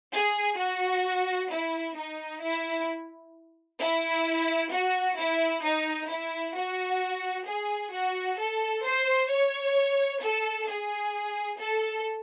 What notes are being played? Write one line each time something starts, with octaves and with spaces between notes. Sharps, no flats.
G#4
F#4
E4
D#4
E4
E4
F#4
E4
D#4
E4
F#4
G#4
F#4
A4
C5
C#5
A4
G#4
A4